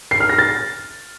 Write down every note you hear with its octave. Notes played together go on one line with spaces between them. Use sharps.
C7
F6
A#6
A6